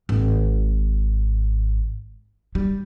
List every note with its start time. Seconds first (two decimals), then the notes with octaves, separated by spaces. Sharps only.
0.09 G#1
2.55 G3